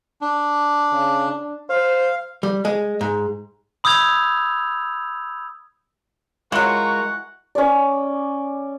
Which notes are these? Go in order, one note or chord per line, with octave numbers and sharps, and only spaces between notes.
D4
C#3
D4
C5 F5
G3
G#3
G#2
B5 D#6 E6 G6 G#6 F7
E3 F#3 G#3 F4 A#4 F#5 A#5 C#6
C#4 D5